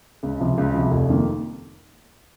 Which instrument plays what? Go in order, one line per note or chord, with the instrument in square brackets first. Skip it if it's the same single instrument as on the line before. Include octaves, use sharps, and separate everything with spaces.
[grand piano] C#2
C3 F3
C#2
C3 F3
F1
F2 D#3 A#3